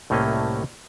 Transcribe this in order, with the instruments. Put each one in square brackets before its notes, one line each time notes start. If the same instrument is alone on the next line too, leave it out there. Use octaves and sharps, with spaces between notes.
[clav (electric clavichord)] C2 A2 A3 A#3 C#4 D#5